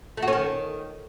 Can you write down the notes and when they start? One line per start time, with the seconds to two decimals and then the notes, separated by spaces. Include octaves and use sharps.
0.17 A3
0.22 F#4
0.28 C#4
0.33 D#3